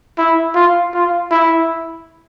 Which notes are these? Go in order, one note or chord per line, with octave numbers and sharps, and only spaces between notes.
E4
F4
F4
E4